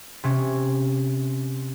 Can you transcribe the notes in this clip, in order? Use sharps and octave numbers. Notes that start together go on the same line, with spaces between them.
C3 C#4